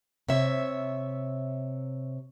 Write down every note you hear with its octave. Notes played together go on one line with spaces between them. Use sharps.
C3 C#5 E5